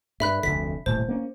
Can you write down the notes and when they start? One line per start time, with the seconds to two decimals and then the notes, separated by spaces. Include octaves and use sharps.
0.20 G2 E5 B5 F#6
0.43 F1 D2 D3 B6
0.86 D#1 A2 C3 C5
1.09 A#3 C#4